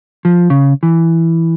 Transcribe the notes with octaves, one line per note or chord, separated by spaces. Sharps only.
F3
C#3
E3